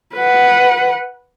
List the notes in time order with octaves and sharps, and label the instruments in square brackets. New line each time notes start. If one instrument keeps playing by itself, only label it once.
[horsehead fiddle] B4 F#5